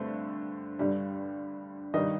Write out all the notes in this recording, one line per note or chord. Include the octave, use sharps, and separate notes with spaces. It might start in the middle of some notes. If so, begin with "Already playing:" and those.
Already playing: G2 D3 A3 C4
G2 D3 G3
G2 D#3 G3 D#5